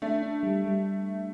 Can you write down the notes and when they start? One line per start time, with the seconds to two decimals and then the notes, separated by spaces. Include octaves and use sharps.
0.02 A3 D4
0.22 D4
0.43 G3
0.64 G3